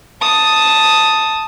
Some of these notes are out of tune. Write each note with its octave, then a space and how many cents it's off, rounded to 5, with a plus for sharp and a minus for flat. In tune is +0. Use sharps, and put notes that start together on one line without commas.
A5 +0 D#6 +0